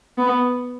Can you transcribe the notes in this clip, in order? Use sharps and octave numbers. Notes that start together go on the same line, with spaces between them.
B3